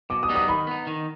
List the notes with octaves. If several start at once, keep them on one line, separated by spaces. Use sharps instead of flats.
B2 D6
D#6
G3 B3 D#4
D#6
D#3 B5
B3 D#4
D#3